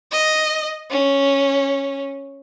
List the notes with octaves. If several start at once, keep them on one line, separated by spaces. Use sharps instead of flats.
D#5
C#4